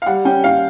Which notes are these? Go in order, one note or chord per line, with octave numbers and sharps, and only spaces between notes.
F5
G3 F#5
C#4 G5
C#4 F5